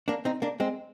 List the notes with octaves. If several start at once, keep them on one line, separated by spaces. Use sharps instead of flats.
A#3 D4
C4 D#4
A#3 D4
G#3 C4